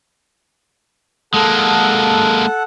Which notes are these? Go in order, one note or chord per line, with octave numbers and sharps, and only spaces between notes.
G#3 A#3 A4 F#5